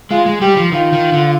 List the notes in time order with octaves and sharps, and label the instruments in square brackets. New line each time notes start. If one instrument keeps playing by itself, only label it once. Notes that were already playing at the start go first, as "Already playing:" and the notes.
[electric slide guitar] G#3 [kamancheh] F4
[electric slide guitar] G#3
[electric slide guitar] G3 [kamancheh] G4
[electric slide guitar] F3
[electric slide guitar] D#3 [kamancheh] F4
[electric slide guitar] D#3
D3